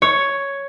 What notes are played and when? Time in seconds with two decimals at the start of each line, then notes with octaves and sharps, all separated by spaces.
0.02 C#5